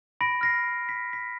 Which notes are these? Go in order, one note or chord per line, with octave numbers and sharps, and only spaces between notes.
B5 A#6 D7
F6 A#6 C7
B6
B6